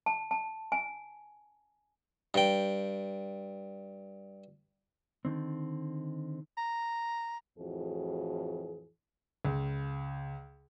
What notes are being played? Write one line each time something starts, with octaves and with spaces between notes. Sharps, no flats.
A5
A5
G#5
G2 G5
D3 D#3 C4
A#5
F2 A2 E3 F#4 G#4
C#2